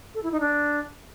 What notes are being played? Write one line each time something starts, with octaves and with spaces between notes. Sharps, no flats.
A4
E4
D#4
D4